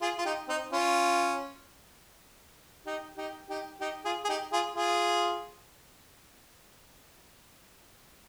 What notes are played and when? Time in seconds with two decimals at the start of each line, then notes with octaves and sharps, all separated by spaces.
0.01 F4 G#4
0.18 F4
0.26 D#4 G4
0.48 C4 D#4
0.72 C#4 F4
2.86 D#4 G4
3.17 D#4 G4
3.50 D#4 G4
3.81 D#4 G4
4.05 F4 G#4
4.25 G#4
4.29 D#4 G4
4.52 F4 G#4
4.76 F4 G#4